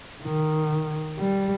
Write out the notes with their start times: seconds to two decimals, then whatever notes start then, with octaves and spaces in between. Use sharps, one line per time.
0.24 D#3
1.19 G3